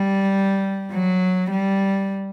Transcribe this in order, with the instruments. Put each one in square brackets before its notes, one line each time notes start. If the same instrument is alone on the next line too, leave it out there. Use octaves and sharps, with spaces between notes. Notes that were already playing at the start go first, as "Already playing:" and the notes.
Already playing: [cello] G3
F#3
G3